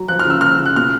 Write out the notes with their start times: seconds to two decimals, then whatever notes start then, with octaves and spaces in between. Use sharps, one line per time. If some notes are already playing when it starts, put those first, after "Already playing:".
Already playing: F#3
0.08 F3 F#6
0.19 F6
0.25 C#3 E6
0.41 C#3 F6
0.59 C#3
0.66 F#6
0.76 B2 F6